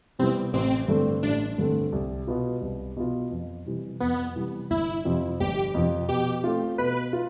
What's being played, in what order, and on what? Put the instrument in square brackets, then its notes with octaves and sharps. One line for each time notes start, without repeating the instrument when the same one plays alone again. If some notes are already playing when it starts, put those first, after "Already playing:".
[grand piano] C3 G3 B3 E4 [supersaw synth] C4
[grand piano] A1 [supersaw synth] C4
[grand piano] G2 D3 A3 C4
[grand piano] A1 [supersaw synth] D4
[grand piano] G2 D3 A3 C4
C2
B2 B3 F4
C2
B2 B3 F4
F2
C3 E3 G3
[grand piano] F2 [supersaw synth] B3
[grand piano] C3 E3 G3
[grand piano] G1 [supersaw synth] E4
[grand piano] F2 C3 F3 C4
[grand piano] G1 [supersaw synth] G4
[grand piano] F2 C3 F3 C4
[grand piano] B2 [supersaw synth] G4
[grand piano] A3 C4 F4
[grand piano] B2 [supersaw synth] B4
[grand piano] F4